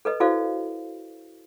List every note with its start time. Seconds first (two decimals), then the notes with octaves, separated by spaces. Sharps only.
0.05 A4 B4 D#5
0.20 E4 F#4 A4 C5 D5 F5